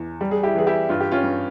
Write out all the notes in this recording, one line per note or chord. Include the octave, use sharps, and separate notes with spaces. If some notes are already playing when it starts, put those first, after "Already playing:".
Already playing: E2
G3
G#4
E4 G4
E3 G#4
E4 G4
G2 F4
G4
C#4 F4
G2